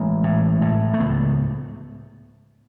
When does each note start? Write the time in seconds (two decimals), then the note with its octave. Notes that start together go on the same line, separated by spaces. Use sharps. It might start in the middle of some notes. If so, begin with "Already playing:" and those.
Already playing: A1 G#3
0.24 A2
0.61 A2
0.93 A3
1.00 C#2 B3